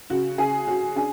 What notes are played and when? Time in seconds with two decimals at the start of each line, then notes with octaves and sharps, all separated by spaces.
0.10 C#3 F#4
0.38 C#3 G#4
0.67 C#4 F#4
0.96 D4 G#4